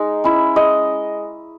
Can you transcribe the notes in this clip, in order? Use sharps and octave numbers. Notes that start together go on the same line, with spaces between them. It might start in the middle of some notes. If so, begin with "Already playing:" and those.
Already playing: G#3 D#4
C#4 E4
G#3 D#5